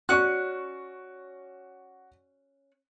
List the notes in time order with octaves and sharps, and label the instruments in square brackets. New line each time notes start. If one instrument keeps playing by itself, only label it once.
[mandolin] C#4 F#6 [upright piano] F#4 D5 C#6